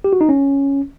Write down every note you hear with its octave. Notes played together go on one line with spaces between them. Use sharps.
G4
F#4
D#4
C#4